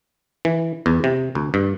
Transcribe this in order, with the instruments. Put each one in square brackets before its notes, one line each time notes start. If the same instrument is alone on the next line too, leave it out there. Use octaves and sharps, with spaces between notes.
[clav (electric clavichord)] E3
E2
C3
D2
G2